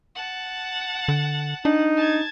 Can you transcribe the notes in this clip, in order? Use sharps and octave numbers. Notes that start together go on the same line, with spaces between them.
F#5 A5
D3
D4 D#4
A5 G#6